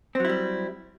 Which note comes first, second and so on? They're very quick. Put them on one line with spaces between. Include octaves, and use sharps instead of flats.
C4 F#3 E4 G3